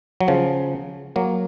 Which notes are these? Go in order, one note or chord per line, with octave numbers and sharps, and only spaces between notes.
F#3
C#3 F3
F#3 A#3